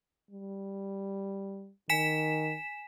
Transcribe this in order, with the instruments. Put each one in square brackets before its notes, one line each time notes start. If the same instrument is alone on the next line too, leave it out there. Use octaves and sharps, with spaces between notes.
[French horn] G3
[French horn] D#3 [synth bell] G#5 B6 E7